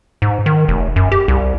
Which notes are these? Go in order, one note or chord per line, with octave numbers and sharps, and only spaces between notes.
G#2
D#3
F1
F#2
G4
C2